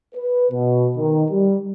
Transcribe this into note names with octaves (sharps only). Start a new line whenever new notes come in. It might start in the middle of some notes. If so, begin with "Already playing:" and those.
B4
B2
D#3
G3